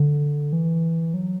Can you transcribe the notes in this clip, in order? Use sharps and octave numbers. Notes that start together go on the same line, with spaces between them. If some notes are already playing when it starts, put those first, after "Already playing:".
Already playing: D3
E3
F#3